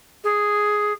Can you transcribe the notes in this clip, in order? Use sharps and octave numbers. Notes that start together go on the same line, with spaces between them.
G#4